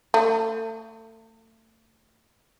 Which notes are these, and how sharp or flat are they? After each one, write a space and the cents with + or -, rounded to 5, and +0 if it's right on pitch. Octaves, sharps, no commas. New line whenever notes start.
A3 +30